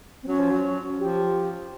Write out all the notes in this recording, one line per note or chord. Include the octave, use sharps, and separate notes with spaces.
C4
F#3 C#4
F3
F#3
F3 G4